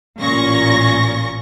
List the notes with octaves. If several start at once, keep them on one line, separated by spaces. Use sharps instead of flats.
A1 A#2 C#4 C#6 A#6